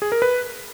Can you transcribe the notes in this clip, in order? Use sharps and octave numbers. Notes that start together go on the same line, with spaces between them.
G#4
A#4
B4